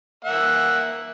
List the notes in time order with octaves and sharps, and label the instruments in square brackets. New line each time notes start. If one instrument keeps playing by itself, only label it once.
[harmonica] A#3 E5 F#5